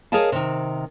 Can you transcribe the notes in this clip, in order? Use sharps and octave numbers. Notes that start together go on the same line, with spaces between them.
G#4 A#4 C#5 D#5 F5 A5
C3 D#3